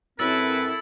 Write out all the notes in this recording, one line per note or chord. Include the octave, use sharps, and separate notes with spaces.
F#2 C4 E4 A4 B4 E6 A6